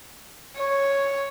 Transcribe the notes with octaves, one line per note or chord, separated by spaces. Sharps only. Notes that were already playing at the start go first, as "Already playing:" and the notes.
C#5